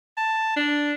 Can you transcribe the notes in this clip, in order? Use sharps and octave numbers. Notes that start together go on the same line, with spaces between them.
A5
D4